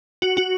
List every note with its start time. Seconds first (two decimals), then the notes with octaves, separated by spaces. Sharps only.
0.22 F#4
0.37 F#4